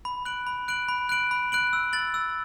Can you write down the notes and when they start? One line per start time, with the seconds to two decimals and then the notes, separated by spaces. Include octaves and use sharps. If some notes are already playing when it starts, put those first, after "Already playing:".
0.05 B5
0.25 F#6 D7 F#7
0.47 B5
0.68 F#6 D7 F#7
0.89 B5
1.09 F#6 D7 F#7
1.31 B5
1.52 F#6 D7 F#7
1.73 E6
1.93 A6 F#7
2.14 E6